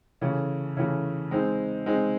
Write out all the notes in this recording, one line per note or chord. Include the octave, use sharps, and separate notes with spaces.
C#3 E3 A3
C#3 E3 A3
G#3 C4 D#4
G#3 C4 D#4